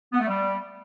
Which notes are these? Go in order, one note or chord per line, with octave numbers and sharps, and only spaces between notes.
B3
A3
G3